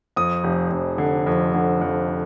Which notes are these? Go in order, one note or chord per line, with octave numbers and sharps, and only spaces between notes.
F2 D#6
F1
F1
D3
F2
D3
F2